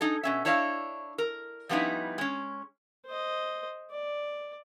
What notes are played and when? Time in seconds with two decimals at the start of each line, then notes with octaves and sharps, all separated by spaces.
0.01 D#4 G#4 A4
0.23 B2 C#4 E5
0.45 D4 E4 C#5 D#5 F5
1.18 A#4
1.69 F3 G3 B3 C#4 D#4 E4
2.18 G#3 C#4
3.06 C5 D#5
3.91 D5